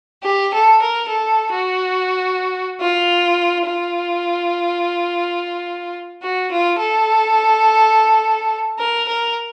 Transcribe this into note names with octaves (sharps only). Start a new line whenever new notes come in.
G4
A4
A#4
A4
F#4
F4
F4
F#4
F4
A4
A#4
A#4